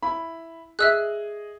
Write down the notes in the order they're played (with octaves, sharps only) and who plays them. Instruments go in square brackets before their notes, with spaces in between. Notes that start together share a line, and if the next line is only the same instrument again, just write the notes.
[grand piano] E4 B5
[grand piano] G#4 D#5 [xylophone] E5 E6 F#6